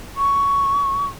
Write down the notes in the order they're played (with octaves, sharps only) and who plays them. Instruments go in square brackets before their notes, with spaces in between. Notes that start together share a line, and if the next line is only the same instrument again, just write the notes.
[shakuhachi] C#6